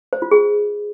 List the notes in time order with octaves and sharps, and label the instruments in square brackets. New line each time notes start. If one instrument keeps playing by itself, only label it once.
[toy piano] C5
F4
G#4